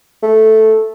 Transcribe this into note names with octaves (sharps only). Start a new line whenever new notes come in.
A3